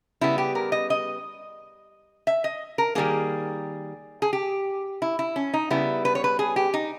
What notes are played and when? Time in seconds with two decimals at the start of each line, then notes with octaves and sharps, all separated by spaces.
0.21 C#3 G3 B3 E4
0.38 G4
0.55 A#4
0.72 D#5
0.90 D#5
2.27 E5
2.44 D#5
2.78 A#4
2.95 D#3 G3 A#3 G#4
4.22 G#4
4.33 G4
5.02 E4
5.19 E4
5.36 C#4
5.54 D#4
5.70 C#3 G3 B3 E4
6.05 B4
6.15 C#5
6.24 B4
6.39 G#4
6.56 G4
6.74 D#4